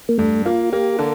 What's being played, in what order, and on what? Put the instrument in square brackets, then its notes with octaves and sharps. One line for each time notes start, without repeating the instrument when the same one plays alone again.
[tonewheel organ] A#3
[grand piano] G2 [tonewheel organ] A3
[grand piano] A#3 [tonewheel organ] F4
[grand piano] A#3 [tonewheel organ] G4
[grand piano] D3 [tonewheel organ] A4